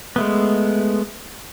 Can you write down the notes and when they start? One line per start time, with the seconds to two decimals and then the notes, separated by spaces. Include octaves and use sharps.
0.16 G#3 A3 B3